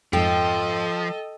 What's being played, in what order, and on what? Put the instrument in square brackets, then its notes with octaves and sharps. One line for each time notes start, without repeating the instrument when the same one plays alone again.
[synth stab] F2 G#2 [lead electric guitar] F3 [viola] A4 D#5 [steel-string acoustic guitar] G5